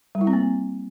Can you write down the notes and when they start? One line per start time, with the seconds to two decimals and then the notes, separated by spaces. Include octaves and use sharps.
0.15 G3
0.21 E4
0.27 C4
0.33 A#3